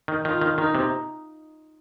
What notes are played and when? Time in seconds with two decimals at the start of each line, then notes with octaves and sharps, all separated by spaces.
0.08 D#3
0.25 D#3 F4
0.41 D#3
0.58 D#3 D#4
0.75 C3